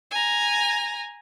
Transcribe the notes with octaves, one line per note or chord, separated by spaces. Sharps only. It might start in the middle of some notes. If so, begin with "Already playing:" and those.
G#5 A#5